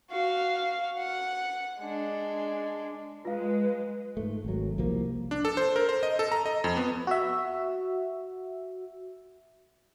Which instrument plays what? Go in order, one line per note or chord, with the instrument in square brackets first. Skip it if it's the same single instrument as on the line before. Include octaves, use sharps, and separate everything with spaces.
[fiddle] F#4 F5
F#5
G#3 D4
[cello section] G#3 [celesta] F4 F5 [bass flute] B4
[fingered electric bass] G#2 A3
G#1 F#3
C2 F3 A#3
[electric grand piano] D4
A4
C5
A#4
C5
D#5
A4
A#5
D#5
F2
B3
[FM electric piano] F#4 E5